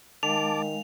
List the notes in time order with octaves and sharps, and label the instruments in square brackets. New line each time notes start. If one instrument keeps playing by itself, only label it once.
[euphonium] D#3 [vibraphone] G#3 F5 G#5 [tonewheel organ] A5 D6 [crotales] F7